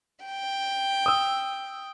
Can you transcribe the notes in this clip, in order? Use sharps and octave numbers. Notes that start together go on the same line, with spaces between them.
G5
D#6 E6